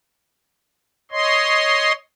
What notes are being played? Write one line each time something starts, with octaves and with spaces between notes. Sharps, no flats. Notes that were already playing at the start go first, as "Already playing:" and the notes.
C#5 D#5 C6